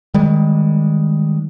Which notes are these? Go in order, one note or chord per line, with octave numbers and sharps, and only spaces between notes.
D#3 G3 G#3